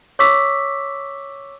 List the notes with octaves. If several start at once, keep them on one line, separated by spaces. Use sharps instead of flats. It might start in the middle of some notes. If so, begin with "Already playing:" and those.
C#5 C#6 D6 E6 B6